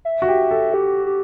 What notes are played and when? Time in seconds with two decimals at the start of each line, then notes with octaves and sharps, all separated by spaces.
0.05 E5
0.22 F#4
0.28 G4
0.51 A4
0.74 G4
1.06 G4